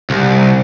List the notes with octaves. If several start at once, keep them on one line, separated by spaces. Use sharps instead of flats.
C2